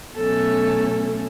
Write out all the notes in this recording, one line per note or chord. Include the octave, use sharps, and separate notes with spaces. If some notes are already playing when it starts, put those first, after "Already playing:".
B2 F#3 A3 C#4 A4